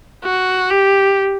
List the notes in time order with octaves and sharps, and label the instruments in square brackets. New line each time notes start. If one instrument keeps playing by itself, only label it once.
[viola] F#4
G4